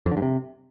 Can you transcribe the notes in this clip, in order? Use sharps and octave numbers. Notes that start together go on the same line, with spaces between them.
F2
D3
G2
C3